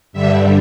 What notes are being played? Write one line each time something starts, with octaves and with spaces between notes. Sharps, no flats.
G2 D3 G3 E5